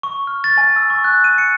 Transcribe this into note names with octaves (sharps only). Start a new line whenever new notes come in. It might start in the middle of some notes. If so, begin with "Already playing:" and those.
C#6
F6
A6
G#5
E6
C#6
F#6
D#7
C#7